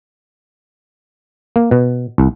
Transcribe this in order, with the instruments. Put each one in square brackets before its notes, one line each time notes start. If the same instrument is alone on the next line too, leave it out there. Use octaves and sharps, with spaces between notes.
[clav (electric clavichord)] A#3
B2
C2